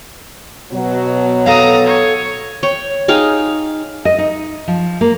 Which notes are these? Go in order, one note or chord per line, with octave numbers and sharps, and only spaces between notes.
B2 F#3
A4 F5 A#5 D#6
C#5
C#5 G5
D#4 G#4 F5 G5
D#5
D#4
F3
A#3